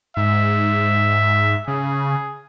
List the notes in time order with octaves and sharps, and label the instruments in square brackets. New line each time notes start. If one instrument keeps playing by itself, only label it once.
[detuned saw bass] G#2 [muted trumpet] E5
[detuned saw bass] C#3 [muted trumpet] G#4